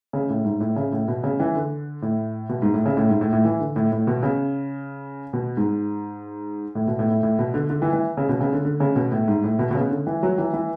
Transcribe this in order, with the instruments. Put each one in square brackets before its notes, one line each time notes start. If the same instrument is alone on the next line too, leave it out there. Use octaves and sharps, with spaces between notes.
[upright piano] C#3
A2
G#2
A2
C#3
A2
B2
C#3
E3
D3
A2
B2
G#2
A2
C#3
A2
G#2
A2
A2
E3
D3
A2
A2
B2
C#3
B2
G#2
A2
B2
A2
A2
A2
B2
D3
D3
E3
E3
C#3
B2
C#3
D3
D3
C#3
B2
A2
G#2
A2
B2
B2
C#3
D3
E3
F#3
E3
E3